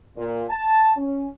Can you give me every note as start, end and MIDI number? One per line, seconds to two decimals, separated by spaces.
0.16 0.43 46
0.50 0.92 81
0.96 1.27 61